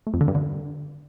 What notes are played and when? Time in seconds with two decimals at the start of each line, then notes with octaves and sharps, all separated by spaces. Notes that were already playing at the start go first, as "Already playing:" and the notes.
0.07 A3
0.14 F2
0.21 D3
0.28 G2
0.35 D3